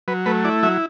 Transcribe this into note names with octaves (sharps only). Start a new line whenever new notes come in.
F#3 B4
A3 B4
E4 D5
F#3 E5